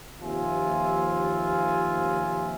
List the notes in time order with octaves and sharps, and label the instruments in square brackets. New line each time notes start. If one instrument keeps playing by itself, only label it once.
[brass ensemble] D#2 C3 F3 F4 E5 G#5